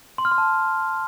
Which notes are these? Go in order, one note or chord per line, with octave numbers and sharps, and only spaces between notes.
C6
F6
C6
A5